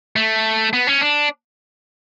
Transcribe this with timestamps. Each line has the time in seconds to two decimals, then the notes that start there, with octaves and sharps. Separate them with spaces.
0.16 A3
0.73 B3
0.87 C#4
1.01 D4